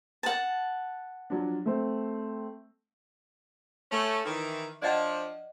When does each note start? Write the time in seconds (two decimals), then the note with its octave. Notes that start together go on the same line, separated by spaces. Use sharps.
0.23 F#5 A5
1.30 F3 F#3 D4
1.66 A3 C4
3.92 A3 C#4
4.25 D#3 E3
4.82 F3 D4 D5 D#5 F#5